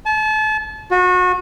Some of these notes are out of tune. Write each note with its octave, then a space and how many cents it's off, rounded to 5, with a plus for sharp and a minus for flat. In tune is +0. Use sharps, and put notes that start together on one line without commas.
A5 -35
F#4 -30